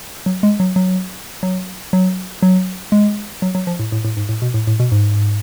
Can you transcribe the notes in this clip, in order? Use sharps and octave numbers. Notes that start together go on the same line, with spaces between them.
F#3
G#3
F#3
F#3
F#3
F#3
F#3
G#3
F#3
F#3
F3
A2
A2
A2
G#2
A2
B2
A2
A2
B2
G#2